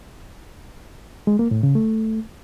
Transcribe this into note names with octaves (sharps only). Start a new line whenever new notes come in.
G#3
A#3
A2
C#3
A3